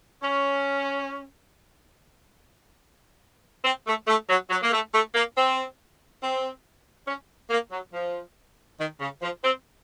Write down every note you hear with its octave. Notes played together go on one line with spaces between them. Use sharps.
C#4
C4
A3
A3
F#3
F#3
A#3
A3
A3
A#3
C4
C4
C#4
A#3
F#3
F3
D#3
C#3
F3
C4